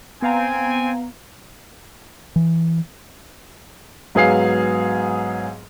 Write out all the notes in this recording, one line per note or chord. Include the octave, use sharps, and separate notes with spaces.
B3 C4 F5 G#5 A#5
E3
G#2 F#3 B3 G#4 F5 C7